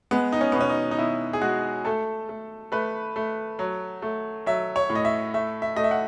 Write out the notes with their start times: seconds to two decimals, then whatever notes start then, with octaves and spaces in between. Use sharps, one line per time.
0.11 G#3 B3
0.32 D#4
0.41 C#4
0.52 B2 B3
0.61 C#4
0.69 D#4
0.91 D#4
0.98 B2 E4
1.33 G#4
1.41 G#3 F#4
1.85 A3 A4
2.29 A3
2.72 A3 B4
3.16 A3
3.59 F#3
4.02 A3
4.46 F#3 E5
4.76 C#5
4.90 A2
4.95 D#5
5.05 E5
5.34 A3 E5
5.62 E5
5.76 A3 D#5
5.84 E5
5.91 F#5